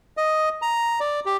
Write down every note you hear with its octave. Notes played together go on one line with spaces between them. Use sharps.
D#5
A#5
D5
G4